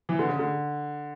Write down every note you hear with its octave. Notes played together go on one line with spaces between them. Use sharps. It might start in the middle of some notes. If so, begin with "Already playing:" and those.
E3
D3
C#3
D3